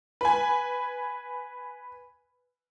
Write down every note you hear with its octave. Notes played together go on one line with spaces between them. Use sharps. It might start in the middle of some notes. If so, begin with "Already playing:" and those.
B4 G#5